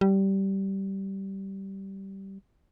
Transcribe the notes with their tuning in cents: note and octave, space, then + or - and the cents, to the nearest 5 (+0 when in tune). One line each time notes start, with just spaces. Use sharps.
G3 -15